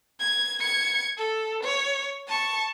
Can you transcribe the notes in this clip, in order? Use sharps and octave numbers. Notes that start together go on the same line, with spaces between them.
G#6
G#6 C#7
A4
C#5
A5 C#6